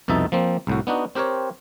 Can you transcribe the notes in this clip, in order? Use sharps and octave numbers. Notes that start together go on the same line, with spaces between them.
C2 F2 B2 D#4 E5 A5
F3 A#3 C4
C2 A2 F#4
B3 D4 D#4 F#4
C4 G4 A#4 C5 C#5